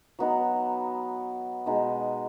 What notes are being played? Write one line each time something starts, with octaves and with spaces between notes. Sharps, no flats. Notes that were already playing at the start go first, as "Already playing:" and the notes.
F#3 B3 D#4
B2 G#3 D#4